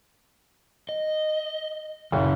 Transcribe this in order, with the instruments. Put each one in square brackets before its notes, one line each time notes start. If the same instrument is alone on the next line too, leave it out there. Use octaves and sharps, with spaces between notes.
[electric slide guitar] D#5
[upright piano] F#1 [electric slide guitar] A#2